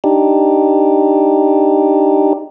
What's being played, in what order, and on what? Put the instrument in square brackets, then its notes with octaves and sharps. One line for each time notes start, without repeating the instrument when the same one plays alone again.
[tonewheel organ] D4 D#4 G4